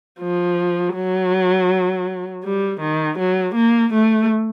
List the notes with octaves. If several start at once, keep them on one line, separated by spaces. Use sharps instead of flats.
F3
F#3
G3
D#3
F#3
A#3
A3